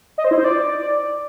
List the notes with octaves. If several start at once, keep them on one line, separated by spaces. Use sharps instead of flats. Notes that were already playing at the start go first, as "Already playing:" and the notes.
D#5
C5
E4
C5
D5